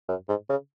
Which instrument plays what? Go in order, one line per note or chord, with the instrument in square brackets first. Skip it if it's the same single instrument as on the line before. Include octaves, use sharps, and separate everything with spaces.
[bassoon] F#2
G#2
C#3